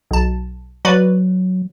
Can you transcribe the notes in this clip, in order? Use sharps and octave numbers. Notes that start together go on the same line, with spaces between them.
B1 A5
F#3 F#4 B4 D5